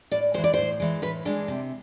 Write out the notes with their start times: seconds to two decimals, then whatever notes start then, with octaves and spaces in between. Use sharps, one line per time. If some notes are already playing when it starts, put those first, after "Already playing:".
0.11 A2 D5
0.34 E3 G#3 C5
0.44 D5
0.54 A2 C5
0.80 E3 G#3
1.02 A2 B4
1.25 E3 G#3 D4
1.48 C3